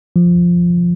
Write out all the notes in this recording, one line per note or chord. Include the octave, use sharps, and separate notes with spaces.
F3